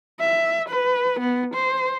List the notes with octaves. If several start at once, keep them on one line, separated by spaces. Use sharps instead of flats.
E5
B4
B3
C5